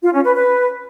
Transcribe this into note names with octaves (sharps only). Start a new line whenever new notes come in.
F4
C#4
B4
B4